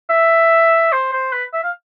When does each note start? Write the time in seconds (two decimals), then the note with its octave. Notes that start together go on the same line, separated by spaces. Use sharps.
0.09 E5
0.92 C5
1.13 C5
1.33 B4
1.53 E5
1.63 F5